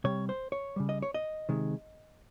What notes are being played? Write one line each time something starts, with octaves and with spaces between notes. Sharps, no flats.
C3 G3 C#5
C5
C#5
C#3 G3
D#5
C#5
D#5
C3 D#3 G#3